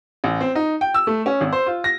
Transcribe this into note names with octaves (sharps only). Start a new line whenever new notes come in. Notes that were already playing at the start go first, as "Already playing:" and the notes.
A1
C4
D#4
G5
E6
A3
C#4
G#1
C5
F4
A#6